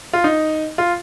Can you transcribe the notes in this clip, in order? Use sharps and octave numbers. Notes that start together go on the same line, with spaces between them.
F4
D#4
F4